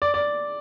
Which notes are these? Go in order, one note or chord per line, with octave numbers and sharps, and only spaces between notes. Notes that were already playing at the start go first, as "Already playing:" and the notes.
D5
D5